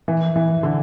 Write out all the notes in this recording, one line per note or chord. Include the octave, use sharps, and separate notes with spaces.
E3
E3
D3